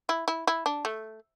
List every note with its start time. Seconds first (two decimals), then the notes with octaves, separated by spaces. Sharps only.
0.09 E4
0.28 E4
0.47 E4
0.66 D4
0.85 A3